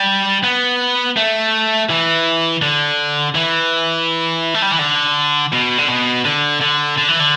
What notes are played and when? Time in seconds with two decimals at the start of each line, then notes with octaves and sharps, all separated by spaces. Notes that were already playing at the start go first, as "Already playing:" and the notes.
Already playing: G3
0.44 B3
1.17 A3
1.90 E3
2.62 D3
3.35 E3
4.54 A3
4.62 G3
4.72 E3
4.79 D3
5.53 B2
5.78 D3
5.88 B2
6.25 D3
6.61 D3
6.98 D3
7.08 E3
7.20 D3